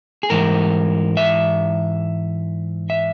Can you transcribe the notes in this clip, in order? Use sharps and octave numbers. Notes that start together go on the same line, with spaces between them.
G#4
G#2 E3 A#4
E5
E5